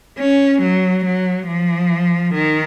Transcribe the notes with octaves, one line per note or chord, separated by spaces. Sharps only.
C#4
F#3
F#3
F3
D#3